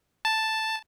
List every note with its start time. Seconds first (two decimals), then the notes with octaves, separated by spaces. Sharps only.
0.25 A5